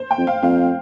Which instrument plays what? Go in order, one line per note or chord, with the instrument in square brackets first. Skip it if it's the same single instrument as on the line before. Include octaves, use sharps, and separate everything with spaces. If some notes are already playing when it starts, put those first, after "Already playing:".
Already playing: [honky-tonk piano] C5
G5
[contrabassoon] F2
[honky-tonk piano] F5
[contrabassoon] F2 [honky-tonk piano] F5